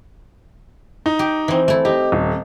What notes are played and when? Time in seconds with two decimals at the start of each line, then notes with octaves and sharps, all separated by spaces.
1.06 D#4
1.19 G4
1.48 E3 C4
1.68 A3 E4
1.85 D#4 G4
2.12 D#1